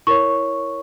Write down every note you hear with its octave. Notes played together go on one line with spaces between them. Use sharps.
E4 A#4 C#5 C#6